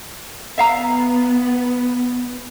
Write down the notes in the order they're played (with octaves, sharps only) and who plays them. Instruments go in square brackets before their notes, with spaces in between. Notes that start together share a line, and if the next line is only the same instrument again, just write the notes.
[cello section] B3 [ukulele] E5 F5 A#5